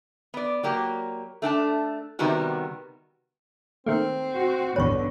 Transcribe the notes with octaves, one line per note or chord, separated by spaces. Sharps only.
B3 D5
F#3 A#3 G4
A3 D4 G5 A5
C3 D#3 G3 B3 F#4
D#3 A3 A#3 C4
F#4
A1 E2 G2 B2 D3 B4 C#5 C#6